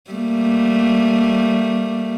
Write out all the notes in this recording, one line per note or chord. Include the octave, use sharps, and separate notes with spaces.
G3 A3 A#3